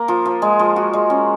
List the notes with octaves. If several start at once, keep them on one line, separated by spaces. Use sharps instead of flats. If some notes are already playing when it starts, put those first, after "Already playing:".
Already playing: A#3
F3
F3
G#3
F3
F#4
G#3
C#4